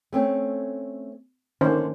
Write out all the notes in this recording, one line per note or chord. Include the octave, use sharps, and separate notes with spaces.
A3 C4 C#4
D3 D#3 A#3 C#4 C5